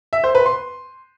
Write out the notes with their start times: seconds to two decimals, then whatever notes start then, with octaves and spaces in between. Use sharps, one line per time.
0.13 E5
0.24 C5
0.35 B4
0.46 C6